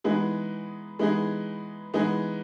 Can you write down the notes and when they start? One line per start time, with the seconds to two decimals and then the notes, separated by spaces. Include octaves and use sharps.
0.04 E3 G#3 B3 D#4 G#4
0.99 E3 G#3 B3 D#4 G#4
1.94 E3 G#3 B3 D#4 G#4